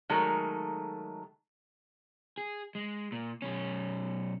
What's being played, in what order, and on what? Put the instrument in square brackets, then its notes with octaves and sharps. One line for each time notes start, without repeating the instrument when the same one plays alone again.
[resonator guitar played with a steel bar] D#3 F#3 G#3 A3 A4 A#4
[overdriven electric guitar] G#4
G#3
A#2
B1 C#4